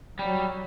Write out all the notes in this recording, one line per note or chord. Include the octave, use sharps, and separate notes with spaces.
F#3 G3